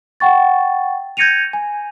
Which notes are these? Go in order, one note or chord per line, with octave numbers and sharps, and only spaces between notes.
F#5 G5 C#6 A6
G6 G#6 A#6 C#7 D#7 F7
G#5